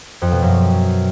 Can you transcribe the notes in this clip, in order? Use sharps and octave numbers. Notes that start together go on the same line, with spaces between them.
F2
B2
F#2